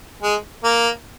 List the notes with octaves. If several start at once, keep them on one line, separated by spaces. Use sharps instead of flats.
G#3
A#3